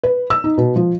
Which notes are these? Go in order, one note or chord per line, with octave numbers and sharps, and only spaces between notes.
B4
E6
D#4
B2
F3